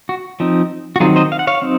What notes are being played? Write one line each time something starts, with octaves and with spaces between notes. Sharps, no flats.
F#4
F3 C4 D#4
F#4
D#3 F#3 C4 D#4 F4 G#4
C5 D#5
F5
F#5
C#5 F5
F#3 C4 D#4